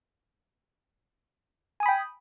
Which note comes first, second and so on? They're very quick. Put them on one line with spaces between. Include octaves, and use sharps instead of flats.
G#5 D#6 B5 G5